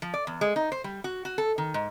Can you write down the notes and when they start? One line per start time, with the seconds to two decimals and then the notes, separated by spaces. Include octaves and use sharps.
0.02 F3
0.14 D5
0.27 E2
0.41 G#3
0.56 D#4
0.72 C5
0.84 G3
1.04 F#4
1.25 F#4
1.38 A4
1.58 D#3
1.74 G#2